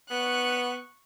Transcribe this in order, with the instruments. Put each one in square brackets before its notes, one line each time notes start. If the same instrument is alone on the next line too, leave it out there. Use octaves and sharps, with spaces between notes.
[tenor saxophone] B3 [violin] C#6 F#6